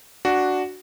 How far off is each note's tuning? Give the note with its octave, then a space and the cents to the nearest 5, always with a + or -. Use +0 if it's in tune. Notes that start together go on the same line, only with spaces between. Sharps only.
D4 +0 F#4 +0